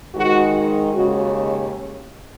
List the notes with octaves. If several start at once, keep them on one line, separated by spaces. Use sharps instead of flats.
G#2 D#3 G#3 D#4 F#4
D#2 C#3 G#3 F#4